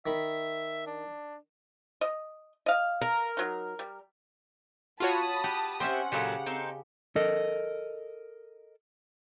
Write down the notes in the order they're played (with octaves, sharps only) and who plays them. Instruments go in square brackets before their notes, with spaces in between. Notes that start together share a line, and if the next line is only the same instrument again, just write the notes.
[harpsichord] D#3 B5 [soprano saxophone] E5
[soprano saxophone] D4
[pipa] D#5
D#5 F5
[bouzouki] A#4
[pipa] F#3 D#4
G3
[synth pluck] F4 F#4 C#5 [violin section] A5 B5 D#6
[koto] G4 F#5
[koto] C4 C#4 G#5 [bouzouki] G4 C5 E5 [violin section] F#5
[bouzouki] A#2 F#3 A4 [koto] C#3 G4
[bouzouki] C4 D#4 A4
[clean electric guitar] A4 A#4 D#5